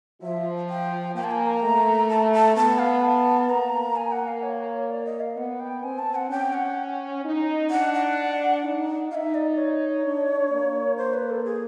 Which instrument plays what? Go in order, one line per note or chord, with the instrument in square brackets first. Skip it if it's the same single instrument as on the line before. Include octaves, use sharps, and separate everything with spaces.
[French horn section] F3 [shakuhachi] E5
[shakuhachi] G5
[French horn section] A#3 [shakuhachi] G5
[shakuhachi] A5
G#5
A#5
[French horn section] A3
[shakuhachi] A5
A5
[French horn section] B3 [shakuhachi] A5
[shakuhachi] F5
A5
[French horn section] A#3 [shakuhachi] A#5
[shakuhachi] G#5
F#5
F5
C#5
D5
D#5
F5
[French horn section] B3 [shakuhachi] F#5
[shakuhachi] G5
[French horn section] C4 [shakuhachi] G#5
[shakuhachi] A5
F#5
[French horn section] C#4 [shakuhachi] G5
[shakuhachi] F#5
[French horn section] D#4
[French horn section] D4 [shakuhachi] F#5
[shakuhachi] F#5
[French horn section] D#4
[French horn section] D#4 [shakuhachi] E5 F5
[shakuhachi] D5
C#5
[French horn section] D4
A#3
[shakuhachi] C5
B4
A4
G#4